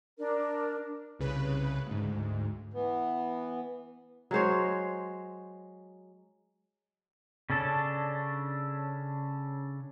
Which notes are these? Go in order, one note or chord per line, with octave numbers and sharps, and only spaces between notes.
D4 A#4
C2 C#3 B4
D2 G#2
E3 B3
F#3 G#3 C5 C#5
C#3 C#4 D4 A4